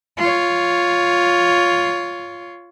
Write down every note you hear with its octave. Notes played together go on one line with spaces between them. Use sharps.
F4 C#5